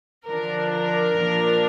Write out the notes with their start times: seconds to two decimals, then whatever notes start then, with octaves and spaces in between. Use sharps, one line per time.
0.25 D3 F3 D4 A#4
0.73 A#4
1.20 A#2 F3 D4